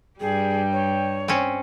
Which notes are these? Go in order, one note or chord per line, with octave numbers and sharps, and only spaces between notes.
G2 G3 G#4 G5
C#5
C4 C#4